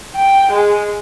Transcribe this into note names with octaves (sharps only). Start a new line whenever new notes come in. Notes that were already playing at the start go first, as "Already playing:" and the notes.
G5
G#3